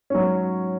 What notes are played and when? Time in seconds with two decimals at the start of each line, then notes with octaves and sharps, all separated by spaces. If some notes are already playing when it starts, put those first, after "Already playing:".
0.10 G#2 F#3 C#4